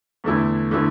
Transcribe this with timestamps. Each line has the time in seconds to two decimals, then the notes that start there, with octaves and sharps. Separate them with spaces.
0.24 E2 D3 A3 E4
0.71 D3 A3 E4